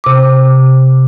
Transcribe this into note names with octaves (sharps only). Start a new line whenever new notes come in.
C3 D6